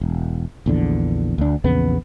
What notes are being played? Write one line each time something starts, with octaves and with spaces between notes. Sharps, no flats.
E1
A#1 E2 D3
D2 D4
A#1 E2 C#3 B3